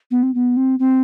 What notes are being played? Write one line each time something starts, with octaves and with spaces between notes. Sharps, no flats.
B3
C4
B3
C4
C4